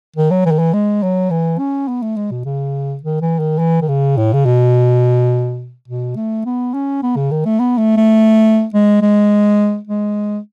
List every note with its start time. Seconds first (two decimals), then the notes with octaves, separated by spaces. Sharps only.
0.16 D#3
0.31 F#3
0.45 E3
0.52 D#3
0.59 E3
0.74 G#3
1.03 F#3
1.30 E3
1.59 C#4
1.88 B3
2.02 A3
2.16 G#3
2.31 B2
2.45 C#3
3.03 D#3
3.21 E3
3.40 D#3
3.59 E3
3.82 D#3
3.88 C#3
4.17 A2
4.33 C#3
4.45 B2
5.88 B2
6.16 A3
6.45 B3
6.74 C#4
7.03 B3
7.16 C#3
7.31 D#3
7.45 A3
7.59 B3
7.78 A3
7.97 A3
8.74 G#3
9.02 G#3
9.87 G#3